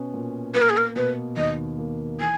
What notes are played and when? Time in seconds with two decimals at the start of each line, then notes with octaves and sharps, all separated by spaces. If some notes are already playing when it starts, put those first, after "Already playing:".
Already playing: B2 B3 C#4
0.14 A#2
0.54 A#3 B4
0.62 A#4
0.70 G#4
0.77 A#4
0.96 B2 B4
1.37 D#2 D#5
1.78 A#3
2.20 E3 G#5